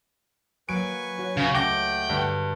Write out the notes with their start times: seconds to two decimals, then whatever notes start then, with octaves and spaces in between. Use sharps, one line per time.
0.69 F#3 A#3 B4 G#5 C#6 D7
1.18 C#4 F#4
1.37 C#2 C#3 C#7
1.55 A3 F#5 G5 D6 A#6
2.10 G2 D3